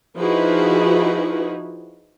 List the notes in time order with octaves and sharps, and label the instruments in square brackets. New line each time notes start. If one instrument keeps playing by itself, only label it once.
[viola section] F3 D#4 E4 F#4 G#4 B4